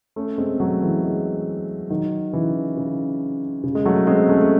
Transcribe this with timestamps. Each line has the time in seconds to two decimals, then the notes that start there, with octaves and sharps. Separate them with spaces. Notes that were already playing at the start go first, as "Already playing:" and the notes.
0.16 A3 C#4
0.38 G#3 C4
0.60 F#3 A3
0.81 E3 G#3
1.03 E3 G#3
1.90 D#3 F#3
2.33 C#3 E3
2.77 C#3
3.64 C#3
3.75 G#3
3.85 F#3 A3
4.07 G#3 C4
4.29 A3 C#4
4.41 A3